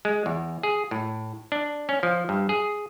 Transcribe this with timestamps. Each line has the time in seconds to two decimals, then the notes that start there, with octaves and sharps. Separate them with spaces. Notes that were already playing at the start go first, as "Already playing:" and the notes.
0.05 G#3
0.26 E2
0.63 G#4
0.91 A2
1.52 D4
1.89 C#4
2.03 F3
2.29 G2
2.49 G#4